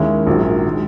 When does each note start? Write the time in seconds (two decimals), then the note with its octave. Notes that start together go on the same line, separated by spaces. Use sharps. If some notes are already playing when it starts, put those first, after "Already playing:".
Already playing: D#2 D#3 G#3 C#4 E4
0.26 A#1 G#2 D#3 F#3
0.66 D#3 G#3